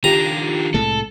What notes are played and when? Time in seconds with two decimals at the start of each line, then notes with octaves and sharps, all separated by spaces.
0.04 D#3 D4 F4 G4 A#5
0.74 C2 A2 G#3 A4